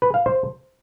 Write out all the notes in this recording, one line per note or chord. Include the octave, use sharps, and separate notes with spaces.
B4
F5
C5